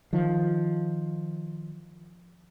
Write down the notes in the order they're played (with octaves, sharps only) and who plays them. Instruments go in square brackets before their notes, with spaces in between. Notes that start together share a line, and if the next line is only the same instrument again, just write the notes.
[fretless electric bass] D#3 F3